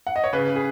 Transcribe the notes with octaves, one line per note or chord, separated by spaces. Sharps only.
F#5
D#5
C#5
C#3 B4
C#3
G#4